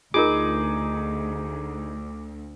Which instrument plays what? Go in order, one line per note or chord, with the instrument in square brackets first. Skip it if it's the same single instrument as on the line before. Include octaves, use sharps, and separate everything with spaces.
[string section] D2 [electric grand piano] D#4 G#4 [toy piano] F4 A#4 [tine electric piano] D6